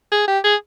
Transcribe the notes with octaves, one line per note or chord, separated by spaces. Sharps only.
G#4
G4
G#4